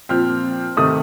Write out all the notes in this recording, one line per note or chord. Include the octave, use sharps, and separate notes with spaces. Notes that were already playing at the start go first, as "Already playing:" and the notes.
A#2 F3 C4 F6
C3 D#3 A3 D#6